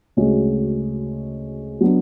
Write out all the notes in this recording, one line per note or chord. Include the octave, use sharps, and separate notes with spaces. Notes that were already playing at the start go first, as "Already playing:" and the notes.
D2 C#3 G#3 C#4 F#4
F#3 B3 D4